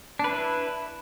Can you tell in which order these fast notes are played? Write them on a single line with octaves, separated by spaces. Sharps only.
D4 B4 E4